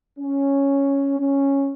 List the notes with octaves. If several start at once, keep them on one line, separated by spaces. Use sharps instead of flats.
C#4
C#4